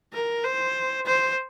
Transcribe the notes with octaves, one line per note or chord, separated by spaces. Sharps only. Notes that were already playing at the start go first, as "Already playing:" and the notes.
A#4
C5
C5